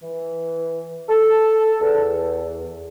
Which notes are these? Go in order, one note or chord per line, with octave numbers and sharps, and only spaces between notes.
E3
A4
E2